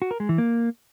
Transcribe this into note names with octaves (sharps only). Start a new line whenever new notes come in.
F#4
A#4
G#3
E3
A#3